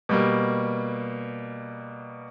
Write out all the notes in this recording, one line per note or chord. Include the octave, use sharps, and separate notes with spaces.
B2 G3 A#3